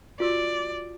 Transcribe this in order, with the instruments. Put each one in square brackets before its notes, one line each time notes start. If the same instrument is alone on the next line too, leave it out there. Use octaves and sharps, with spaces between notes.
[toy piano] F4 F#4 E6 [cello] D5